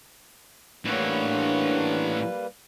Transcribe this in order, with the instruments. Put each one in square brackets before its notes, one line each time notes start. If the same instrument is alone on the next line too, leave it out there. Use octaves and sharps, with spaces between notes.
[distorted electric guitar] A2 E3 [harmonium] G3 A#3 B4 [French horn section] D4 [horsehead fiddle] C#5 F#5